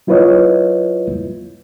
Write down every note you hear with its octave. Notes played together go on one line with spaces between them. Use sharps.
F#3 E4 F4 B4 C#5 D#5